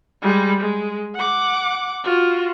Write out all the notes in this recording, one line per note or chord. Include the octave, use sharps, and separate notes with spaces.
G3 G#3
G#3
F#5 D6
F4 F#4